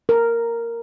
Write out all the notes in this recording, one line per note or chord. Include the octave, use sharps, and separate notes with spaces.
A#4